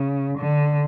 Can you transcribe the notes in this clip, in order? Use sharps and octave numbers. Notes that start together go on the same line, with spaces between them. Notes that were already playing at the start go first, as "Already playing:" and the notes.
Already playing: C#3
D3